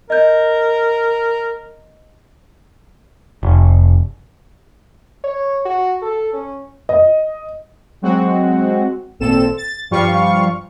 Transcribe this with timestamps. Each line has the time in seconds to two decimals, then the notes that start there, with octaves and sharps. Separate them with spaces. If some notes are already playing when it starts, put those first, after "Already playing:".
0.10 A#4 D#5 G6
3.43 F1
5.24 C#5
5.65 F#4
6.02 A4
6.33 C#4
6.89 D#5
8.02 F#3 G#3 C4 F#4
9.19 G#1 A#2 C4 A4 E7
9.57 A6
9.90 G2 F3 G3 F4 F5 C#6